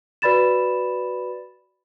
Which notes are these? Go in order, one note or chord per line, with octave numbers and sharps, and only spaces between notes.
F#4 B4 D5 B5 A6 E7